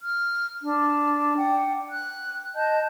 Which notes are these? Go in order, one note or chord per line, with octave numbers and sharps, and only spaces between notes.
F6
D4
F#5 G5
F#6
D#5 A5 G6